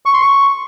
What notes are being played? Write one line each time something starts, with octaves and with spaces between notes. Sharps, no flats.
C#6
C6
C#6